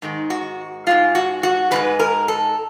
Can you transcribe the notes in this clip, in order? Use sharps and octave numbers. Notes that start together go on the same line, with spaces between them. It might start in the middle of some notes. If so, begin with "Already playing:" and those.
G#2 D#3 G#3
F#4
G#2 D#3 G#3 F4
F#4
F#4
G#2 D#3 G#3 B4
A#4
A4